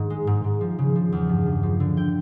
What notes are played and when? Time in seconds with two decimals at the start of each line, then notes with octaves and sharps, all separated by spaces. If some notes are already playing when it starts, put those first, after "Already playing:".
Already playing: G#2 D#3
0.10 G#3
0.27 G#2
0.44 G#2
0.61 F3
0.79 C#3
0.96 F3
1.12 E2
1.29 G2
1.46 G2
1.63 F3
1.80 D3
1.97 G5